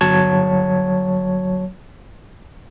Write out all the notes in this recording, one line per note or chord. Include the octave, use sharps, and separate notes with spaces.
G1 F#3 C#5 A5 G#6